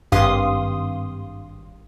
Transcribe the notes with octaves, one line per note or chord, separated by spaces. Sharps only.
G#1 G2 G4 F5 C6 D#6